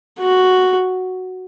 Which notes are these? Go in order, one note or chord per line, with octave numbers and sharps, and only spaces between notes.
F#4